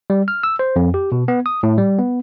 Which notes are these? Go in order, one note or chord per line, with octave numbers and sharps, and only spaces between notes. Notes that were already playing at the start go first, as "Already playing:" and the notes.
G3
F6
E6
C5
F2
G4
B2
B3
D#6
A2
G3
B3